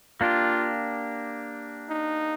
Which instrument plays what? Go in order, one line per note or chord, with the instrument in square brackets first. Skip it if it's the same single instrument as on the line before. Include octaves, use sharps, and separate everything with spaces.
[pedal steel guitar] A#3 D4 G4 [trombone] F4
[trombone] D#4